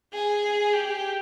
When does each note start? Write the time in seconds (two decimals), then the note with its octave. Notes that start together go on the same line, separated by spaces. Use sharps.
0.14 G#4
0.73 G4